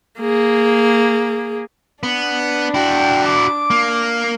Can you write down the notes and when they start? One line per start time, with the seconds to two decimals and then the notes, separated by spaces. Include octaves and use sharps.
0.20 A#3 G#4
2.03 B3 D4
2.74 E4 F#4 G5
3.26 D6
3.70 A#3